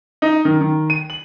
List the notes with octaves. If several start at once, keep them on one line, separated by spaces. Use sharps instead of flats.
D#4
D#3
D#3
D#7
F#7